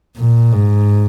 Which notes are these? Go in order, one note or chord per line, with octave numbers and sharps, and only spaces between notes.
A#2
G#2